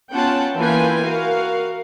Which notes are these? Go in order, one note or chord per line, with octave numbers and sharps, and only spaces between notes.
B3 C#4 F4 F#5 G5 A5
E3 A#3 F4 B4 G5 G#5
F#4 A#4 F5